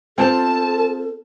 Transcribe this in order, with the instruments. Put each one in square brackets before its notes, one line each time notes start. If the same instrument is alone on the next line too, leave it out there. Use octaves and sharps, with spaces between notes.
[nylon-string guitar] C4 F4 C5 [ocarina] A4 [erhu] A5